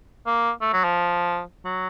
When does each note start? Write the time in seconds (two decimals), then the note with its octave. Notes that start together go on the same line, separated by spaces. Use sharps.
0.26 A#3
0.61 A3
0.73 F#3
0.84 F3
1.65 F#3